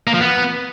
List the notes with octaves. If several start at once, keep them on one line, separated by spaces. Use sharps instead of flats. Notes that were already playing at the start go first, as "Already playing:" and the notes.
A#3
F3
B3